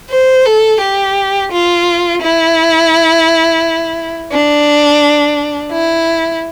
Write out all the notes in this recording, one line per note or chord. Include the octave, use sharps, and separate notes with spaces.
C5
A4
G4
F4
E4
D4
E4